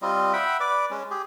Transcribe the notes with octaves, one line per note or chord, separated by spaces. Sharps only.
G3 C4 F4 D#5
E5 F#5 G5 B5
B4 D5 D6
G#3 C#4
G4 G#4